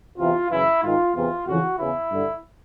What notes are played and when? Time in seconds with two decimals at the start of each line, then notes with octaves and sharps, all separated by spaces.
0.18 E2 C3 E3 F4
0.50 F#2 C#3 E3 E4
0.82 G#2 D#3 F4
1.14 E2 C3 E3 F4
1.46 F2 C#3 E3 F#4
1.78 E2 C#3 E3 E4
2.10 G2 D3